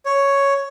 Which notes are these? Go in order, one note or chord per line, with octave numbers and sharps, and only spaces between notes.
C#5